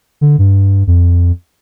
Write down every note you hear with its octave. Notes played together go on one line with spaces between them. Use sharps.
D3
G2
F2